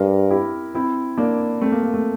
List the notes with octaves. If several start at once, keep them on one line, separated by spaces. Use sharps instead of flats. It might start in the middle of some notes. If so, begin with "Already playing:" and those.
Already playing: G2 G4 A#4
E4 G4
C4 E4
A#3 D4
A3 C4
A#3
A#3
A3 C4